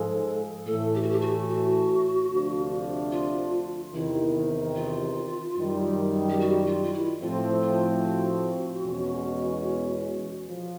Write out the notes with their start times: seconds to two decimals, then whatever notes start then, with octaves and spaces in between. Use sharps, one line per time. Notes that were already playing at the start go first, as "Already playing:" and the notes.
Already playing: G#2 F3 G#3 A4
0.66 A2 E3 A3 A4
0.94 G4
1.02 F#4
1.10 G4
1.21 F#4
1.48 F#4
2.30 D2 C3 F3 A3 D4
3.12 F4
3.94 E2 C3 D#3 E4
4.76 F4
5.57 F#2 D#3 G3
6.29 G4
6.40 F#4
6.67 F4
6.83 F4
6.93 E4
7.21 A2 F3 A3 C4 F4
7.62 F4
8.04 F#4
8.85 E2 B2 G#3 C#4
10.48 F3